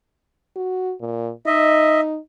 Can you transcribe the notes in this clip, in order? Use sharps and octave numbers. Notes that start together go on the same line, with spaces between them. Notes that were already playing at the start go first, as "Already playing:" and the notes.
F#4
A#2
D#4 D#5 E5